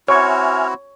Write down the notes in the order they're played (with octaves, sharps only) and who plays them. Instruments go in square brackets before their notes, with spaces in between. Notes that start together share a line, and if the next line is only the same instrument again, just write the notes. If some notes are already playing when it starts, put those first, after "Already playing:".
[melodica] C4 E4 F#4 [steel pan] C#5 [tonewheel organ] E5 G#5 F6